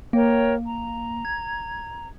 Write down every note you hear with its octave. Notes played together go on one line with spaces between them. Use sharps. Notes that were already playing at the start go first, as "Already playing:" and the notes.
A#3 A#4 C#5 G5
A#5
G#6